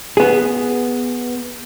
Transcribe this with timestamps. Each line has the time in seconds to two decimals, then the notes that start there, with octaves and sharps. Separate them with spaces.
0.17 B3 G#4